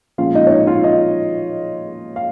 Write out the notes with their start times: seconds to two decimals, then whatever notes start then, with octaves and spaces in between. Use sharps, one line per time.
0.18 A#2 F3 G#3 C#4 F4 F5
0.35 D#4 D#5
0.47 C#5
0.51 D#4 D#5
0.67 F4 F5
0.84 D#4 D#5
2.16 F5